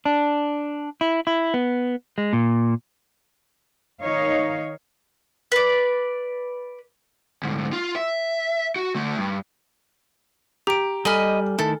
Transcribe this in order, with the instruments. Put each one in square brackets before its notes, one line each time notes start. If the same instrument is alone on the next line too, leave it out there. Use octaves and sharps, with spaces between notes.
[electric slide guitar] D4
E4
E4
B3
G#3
A#2
[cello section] D#3 D#4 C#5 F5
[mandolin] B4 D5
[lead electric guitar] D2 G#2
F4
E5
F#4
D3 A3
G2
[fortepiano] G4 [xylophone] A#5 D7
[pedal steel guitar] G3 [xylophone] A4 G#5 F6 [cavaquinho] D#5 B5
[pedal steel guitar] D#3 A3 E4 [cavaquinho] A4